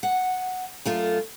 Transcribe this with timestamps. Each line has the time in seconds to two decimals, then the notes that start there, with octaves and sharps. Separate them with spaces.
0.03 F#5
0.85 F#2 A3 F4